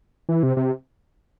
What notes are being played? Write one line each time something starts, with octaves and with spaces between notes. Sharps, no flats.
E3
C3
C3